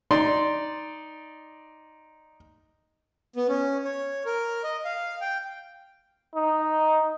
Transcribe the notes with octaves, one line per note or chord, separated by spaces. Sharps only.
D#4 D5 C6
B3
C#4
C#5
A#4
D#5
F5
G5
D#4